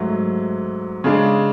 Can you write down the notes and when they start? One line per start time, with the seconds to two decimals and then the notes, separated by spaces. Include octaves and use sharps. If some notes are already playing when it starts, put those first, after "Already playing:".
Already playing: G#2 F#3 A3
1.04 C#3 G#3 D4